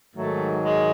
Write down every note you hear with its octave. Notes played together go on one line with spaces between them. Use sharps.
G#2 D#3 F#3 A3
G#3